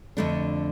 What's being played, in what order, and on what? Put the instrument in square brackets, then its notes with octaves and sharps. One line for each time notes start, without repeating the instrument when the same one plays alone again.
[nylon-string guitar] F2 D3 A3 D4